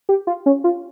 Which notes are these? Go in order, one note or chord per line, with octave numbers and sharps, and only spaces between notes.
G4
F4
C#4
F4